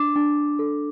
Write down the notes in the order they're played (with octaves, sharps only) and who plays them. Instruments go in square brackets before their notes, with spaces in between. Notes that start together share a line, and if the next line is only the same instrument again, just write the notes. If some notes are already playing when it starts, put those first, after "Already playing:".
Already playing: [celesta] D4 D6
D4
A4